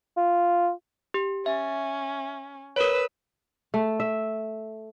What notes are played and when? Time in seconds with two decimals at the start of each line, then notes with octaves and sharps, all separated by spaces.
0.17 F4
1.14 G4
1.46 C#4 E5
2.76 A#4 B4 C#5 E6
3.74 A3
4.00 E5